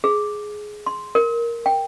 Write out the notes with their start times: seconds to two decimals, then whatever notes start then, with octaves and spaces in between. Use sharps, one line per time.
0.04 G#4
0.86 C6
1.15 A#4
1.66 G5